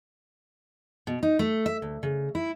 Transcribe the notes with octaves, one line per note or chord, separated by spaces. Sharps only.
B2
D#4
A3
E5
D2
C#3
E4